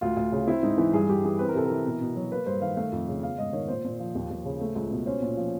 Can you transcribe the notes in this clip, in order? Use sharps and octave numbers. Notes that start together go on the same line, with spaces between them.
D2 F4
D2
C#3
C4 E4
G#2 D#4
E3 E4
G2 G#4
G2 G4
E3 G#4
C4 B4
A#4
C3 A4
E3 A#4
B2
B2
F#3
A#3 B4
G2 C5
D#3 F5
A3 F5
F2
C#3
B3 F5
G#2 D#5
D#3 C#5
A#2 C5
A#2
F3
D#2
D#2
C#3
A3
C#2
B2
C#4 C5
A#2
F3